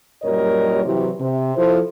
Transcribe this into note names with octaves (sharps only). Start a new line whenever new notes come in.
F#2 A#2 G3 A#4 C#5 D#5
C3 E3 F#3 E4 F#4 G4
C3
F3 E4 A4 C5